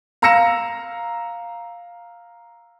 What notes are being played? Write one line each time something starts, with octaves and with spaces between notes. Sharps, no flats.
F5 A#5 E6 A#6 C#7 E7